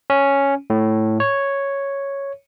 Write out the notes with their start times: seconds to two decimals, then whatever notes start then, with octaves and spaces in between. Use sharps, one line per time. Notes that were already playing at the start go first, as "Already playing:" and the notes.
0.10 C#4
0.70 A2
1.20 C#5